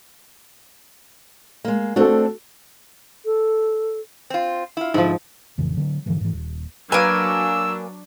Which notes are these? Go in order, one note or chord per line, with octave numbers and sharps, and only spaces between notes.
G#3 A#3
A3 C4 D4 F#4 A4
A4
C4 F4
E4 F4
G#2 D3 F3 E4
A1 F2 C#3 E3
D3 F#3
G#2 D3 E3 F3
G#2 E3
D#1
F#3 A#3 D4 B4 G#5 E6